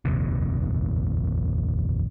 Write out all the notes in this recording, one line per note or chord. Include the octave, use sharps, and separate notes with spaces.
F1 A#1 D#2 C3